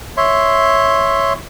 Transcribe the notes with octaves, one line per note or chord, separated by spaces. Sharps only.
C#5 E5 C6